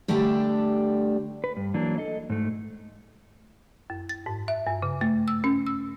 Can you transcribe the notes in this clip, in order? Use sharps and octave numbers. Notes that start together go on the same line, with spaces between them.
D3 G3 A3 D4 G4
B4
G2
E3 F#3 A#3 D4
A4 D#5
G#2 A3
F#2
A6
G#2
E5
G2
C#3
A3
E6
C#4
E6